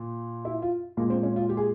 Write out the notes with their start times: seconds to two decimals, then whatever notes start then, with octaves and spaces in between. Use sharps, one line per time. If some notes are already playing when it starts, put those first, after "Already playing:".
Already playing: A#2
0.45 E4
0.62 F4
0.97 A#2 G#3 A#3
1.10 C4
1.23 C#4
1.36 F4
1.49 G4
1.57 G#4